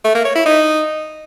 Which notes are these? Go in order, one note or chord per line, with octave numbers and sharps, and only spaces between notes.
A3
A#3
C#5
E4
D#4